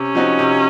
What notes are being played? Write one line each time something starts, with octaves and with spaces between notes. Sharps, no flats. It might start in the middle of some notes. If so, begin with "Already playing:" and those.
Already playing: C3 C#4
F3 C4 D#4 F#4
C3